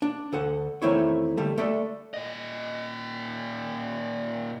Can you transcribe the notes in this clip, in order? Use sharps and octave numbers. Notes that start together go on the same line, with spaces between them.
D4
D2 A4 F#5
E2 D#3 A3 C4 E4 C#5
D3 G3 A3
A3 A4 D5 E5
A#2 D#5